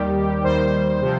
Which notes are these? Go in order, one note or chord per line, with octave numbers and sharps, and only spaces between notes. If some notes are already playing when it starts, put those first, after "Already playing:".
Already playing: D#2 D#3 G3 G4
D#2 D#3 G3 C5
C3 F3